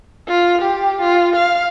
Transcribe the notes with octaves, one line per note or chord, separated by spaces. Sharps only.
F4
G4
F4
F5